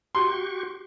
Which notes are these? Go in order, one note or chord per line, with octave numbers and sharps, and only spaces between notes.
F#4 G4 C6 C#6